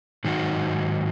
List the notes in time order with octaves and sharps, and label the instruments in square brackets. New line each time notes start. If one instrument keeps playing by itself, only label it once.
[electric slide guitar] G#2 D#3 F#3 D#4 F#4